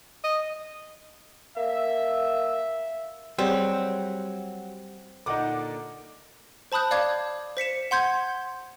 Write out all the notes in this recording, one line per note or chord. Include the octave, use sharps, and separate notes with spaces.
D#5
A#3 E5
F#3 G3 C4 G4 G#4
A#2 D3 D#4 F#5 D6
C5 A5 B5 D#6 F#6 G6
D5 F5 D6 G#6
C5 B6 C#7 E7
F#5 C6 G6 G#6